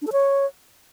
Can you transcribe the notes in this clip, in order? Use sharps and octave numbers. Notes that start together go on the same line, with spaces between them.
D4
A4
C#5